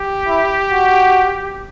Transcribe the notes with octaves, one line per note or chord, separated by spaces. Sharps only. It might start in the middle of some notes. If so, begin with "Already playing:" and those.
Already playing: G4
E4
F#4